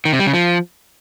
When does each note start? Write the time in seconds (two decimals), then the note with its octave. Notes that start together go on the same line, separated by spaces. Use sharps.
0.05 D#3
0.12 C3
0.19 G3
0.26 C#3
0.33 F3